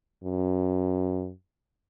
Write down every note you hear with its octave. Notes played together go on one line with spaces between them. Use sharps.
F#2